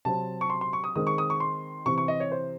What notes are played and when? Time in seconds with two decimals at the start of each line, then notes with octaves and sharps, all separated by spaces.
0.05 C3 F#3 C4 A5
0.41 C#6
0.50 C6
0.61 C6
0.73 C#6
0.84 D#6
0.96 D#3 G#3 C4 D#6
1.07 C#6
1.18 D#6
1.30 C#6
1.40 C6
1.86 C3 E3 C4 C#6
1.98 C#6
2.08 D#5
2.20 C#5
2.32 C5